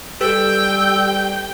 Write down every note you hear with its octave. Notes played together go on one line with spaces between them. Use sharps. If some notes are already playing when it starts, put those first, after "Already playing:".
G3 G4 A4 B4 G5 E6